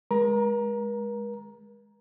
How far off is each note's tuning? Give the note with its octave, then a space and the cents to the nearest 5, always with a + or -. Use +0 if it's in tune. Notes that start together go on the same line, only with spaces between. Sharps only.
G#3 +0 A#4 +45 A#5 +10